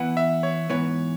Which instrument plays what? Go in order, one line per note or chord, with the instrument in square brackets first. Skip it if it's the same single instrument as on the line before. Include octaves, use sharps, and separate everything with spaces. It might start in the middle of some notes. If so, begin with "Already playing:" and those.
Already playing: [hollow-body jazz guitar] E3 B3 E4 B4 [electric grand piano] F#5
[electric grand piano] E5
C#5
[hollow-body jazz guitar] G#2 E3 B3 [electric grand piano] C#5